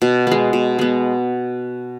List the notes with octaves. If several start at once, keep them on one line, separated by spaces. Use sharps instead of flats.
B2
G#3 B3
B2
G#3 B3